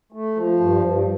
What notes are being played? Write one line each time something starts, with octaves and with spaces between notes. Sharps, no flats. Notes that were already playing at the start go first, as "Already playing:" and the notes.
A3
F3
G2
G2